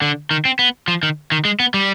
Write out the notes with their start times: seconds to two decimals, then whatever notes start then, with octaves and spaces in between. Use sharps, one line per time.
0.02 D3
0.31 D#3
0.45 C4
0.59 B3
0.88 F3
1.03 D#3
1.32 D#3
1.45 G#3
1.60 B3
1.74 G3